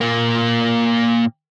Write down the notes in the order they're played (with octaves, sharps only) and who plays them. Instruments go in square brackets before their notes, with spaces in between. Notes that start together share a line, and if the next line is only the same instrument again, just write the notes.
[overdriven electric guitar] A#2 A#3